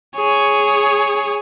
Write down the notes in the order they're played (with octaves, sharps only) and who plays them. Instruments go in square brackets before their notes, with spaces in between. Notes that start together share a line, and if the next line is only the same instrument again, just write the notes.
[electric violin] G#4 C#5